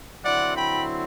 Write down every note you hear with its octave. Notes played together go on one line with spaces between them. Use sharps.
D3 F#3 C4 E4 D5 F#5
G5 B5